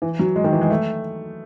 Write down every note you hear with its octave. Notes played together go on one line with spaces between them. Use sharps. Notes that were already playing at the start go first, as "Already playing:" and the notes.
E3
F#3
G#3
D#3
E3
G#3
A3